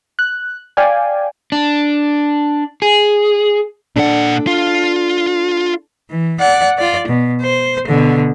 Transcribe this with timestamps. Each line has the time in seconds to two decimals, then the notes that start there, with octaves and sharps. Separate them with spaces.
0.19 F#6
0.77 D5 F5 G5 G#5
1.52 D4
2.82 G#4
3.96 A#2 D4 A4 F#5
4.47 F4
6.10 E3
6.40 D5 F#5
6.78 F4 D5
7.08 B2
7.42 C5
7.87 B2 D3